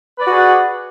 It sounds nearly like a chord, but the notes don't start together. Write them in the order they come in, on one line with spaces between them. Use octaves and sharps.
B4 D5 F#4 G#4 F#5